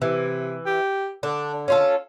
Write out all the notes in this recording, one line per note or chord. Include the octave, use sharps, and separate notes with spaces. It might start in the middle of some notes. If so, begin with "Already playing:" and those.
C3 E3
G4
D3 D4
C#4 F4 A4